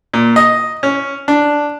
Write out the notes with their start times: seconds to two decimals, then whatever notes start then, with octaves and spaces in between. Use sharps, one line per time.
0.14 A#2
0.36 D#5
0.83 C#4
1.28 D4